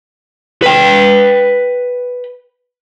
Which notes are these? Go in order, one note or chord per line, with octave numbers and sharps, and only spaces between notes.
B4 G5